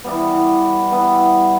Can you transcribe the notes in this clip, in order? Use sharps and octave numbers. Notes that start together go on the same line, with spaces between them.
E3 G3 B3
G3 B3 E4